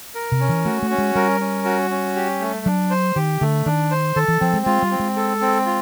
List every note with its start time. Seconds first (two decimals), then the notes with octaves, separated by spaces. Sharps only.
0.15 A#4
0.32 C3
0.40 C#4
0.49 E3
0.65 A3 F#4
0.82 A3
0.90 C#4
0.98 G#3
1.15 G3 A#4
1.40 C#4
1.65 F#4
1.90 C#4
2.16 G4
2.40 A3
2.66 F#3 D4
2.90 C5
3.16 D#3 G4
3.41 D3 A3
3.66 D#3 D4
3.91 C5
4.16 D#3 A4
4.28 E3
4.41 F3 C4
4.53 G#3
4.66 G#3 F4
4.82 G3
4.91 C4
4.99 G#3
5.16 A4
5.41 C4
5.66 F4